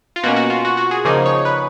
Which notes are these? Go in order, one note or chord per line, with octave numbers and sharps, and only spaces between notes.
F4
B2 A#3 C#4 F#4
F#4
F4
F#4
F#4
G#4
C#3 F3 A#3 D#4 G#4
C#5
B4